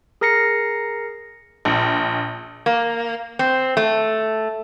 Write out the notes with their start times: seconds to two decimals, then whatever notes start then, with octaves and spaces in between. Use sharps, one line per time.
0.21 G#4 A#4 A#5 A#6 C7 C#7
1.65 A#1
2.66 A#3
3.39 C4
3.77 A3